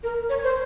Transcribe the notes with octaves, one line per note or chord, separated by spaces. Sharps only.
A#4
C#5
C5